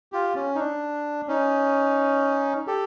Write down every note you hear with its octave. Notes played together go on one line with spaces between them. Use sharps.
F4 G4
C#4
D#4
D4
C#4 D#4
G4 A4